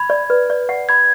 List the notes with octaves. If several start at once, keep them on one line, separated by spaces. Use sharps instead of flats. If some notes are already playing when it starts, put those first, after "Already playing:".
Already playing: B5 G#6
D5
B4
D5
F#5
B5 G#6